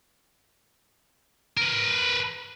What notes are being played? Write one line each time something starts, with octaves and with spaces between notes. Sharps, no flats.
A#4 B4